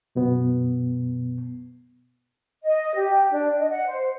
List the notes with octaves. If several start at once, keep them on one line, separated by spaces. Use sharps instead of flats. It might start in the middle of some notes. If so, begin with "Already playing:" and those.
F#2 B2 B3
D#5
G4
D4
D#5
F#5
C5